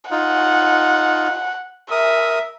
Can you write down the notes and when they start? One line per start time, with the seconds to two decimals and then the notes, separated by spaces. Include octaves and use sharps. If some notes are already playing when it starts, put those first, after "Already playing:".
0.11 D#4 F4 F#5
1.91 A#4 E5 D#6